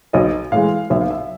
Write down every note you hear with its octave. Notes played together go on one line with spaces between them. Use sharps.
B1 D#5
A2 E3 G#3 F5
B1 E5
F5
E5